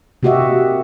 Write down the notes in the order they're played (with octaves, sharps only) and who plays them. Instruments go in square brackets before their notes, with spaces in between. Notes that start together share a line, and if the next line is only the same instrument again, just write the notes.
[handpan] C3 A#3 F#4 G4 D#5 E5